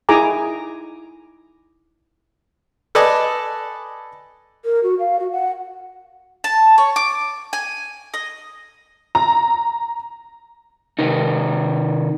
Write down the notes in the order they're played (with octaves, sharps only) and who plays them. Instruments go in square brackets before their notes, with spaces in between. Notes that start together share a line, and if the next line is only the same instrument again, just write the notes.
[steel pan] D#4 E4 G#4 G#5 A#5 D6
[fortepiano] A4 B4 D5 D#5 G#5 A5
[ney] A#4
F#4
F5
F#4
F#5
[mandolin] A5
C#5
D6
G#5
D#5
[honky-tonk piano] A#5
[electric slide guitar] C3 D#3 D#4